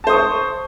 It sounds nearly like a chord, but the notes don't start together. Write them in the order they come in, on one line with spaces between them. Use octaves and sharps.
A5 C5 D#6 C#6